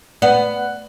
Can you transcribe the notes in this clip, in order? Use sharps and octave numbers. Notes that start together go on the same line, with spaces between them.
B3 D5 F#5